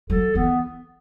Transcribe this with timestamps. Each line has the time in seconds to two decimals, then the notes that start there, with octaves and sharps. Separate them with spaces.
0.10 F#3 A4
0.35 E3 B3